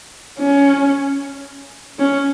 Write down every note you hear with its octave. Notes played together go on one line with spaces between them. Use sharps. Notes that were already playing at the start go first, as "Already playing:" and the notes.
C#4
C#4